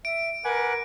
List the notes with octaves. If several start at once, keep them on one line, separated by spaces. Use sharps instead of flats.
E5 D7
A#4 B4 F#5 G#5 D6